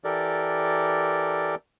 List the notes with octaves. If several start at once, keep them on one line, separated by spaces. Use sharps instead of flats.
E3 G4 A4 A#4 D5